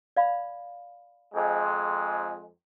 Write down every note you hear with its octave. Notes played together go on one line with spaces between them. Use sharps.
D5 F5 B5
F2 G#3